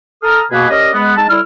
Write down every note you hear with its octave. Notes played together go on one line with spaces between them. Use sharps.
A4 A#5 D#6 F6
B2 A#3 G#4 B4
C#4 G4 A#4 D5 D#5
G#3 B3
G#3 D#4 A5
A2 G3 E4 E6 F6